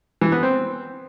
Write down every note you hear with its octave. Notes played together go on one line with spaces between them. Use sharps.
E3
B3
C4